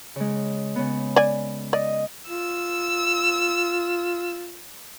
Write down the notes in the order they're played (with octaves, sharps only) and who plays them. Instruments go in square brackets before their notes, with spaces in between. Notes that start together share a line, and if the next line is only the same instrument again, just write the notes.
[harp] C#3 G#3
C#3 B3
[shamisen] D5 G#5
[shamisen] D5 [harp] D#5
[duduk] F4 [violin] E6